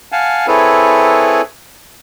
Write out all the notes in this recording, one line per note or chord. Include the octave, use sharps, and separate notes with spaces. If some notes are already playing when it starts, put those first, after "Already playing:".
F5 F#5 G#5 A5
C4 E4 G#4 A4 B4 C#5